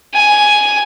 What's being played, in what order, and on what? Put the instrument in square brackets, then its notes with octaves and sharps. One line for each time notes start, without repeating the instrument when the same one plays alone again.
[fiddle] G#5